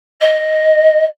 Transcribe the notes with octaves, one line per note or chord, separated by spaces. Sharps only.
D#5